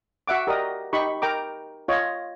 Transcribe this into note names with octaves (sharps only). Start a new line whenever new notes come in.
F#4 E5 F#5 D6
G4 A#4 D5 D#5 D#6
D#4 G4 B5 C#6
A#4 G5 A#5 D6
F4 C#5 D#5